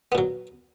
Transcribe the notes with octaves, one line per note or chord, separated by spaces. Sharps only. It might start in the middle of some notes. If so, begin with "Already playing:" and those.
A#2 F#3 B3